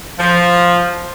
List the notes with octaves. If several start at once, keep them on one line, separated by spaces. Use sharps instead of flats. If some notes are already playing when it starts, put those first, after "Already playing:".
F3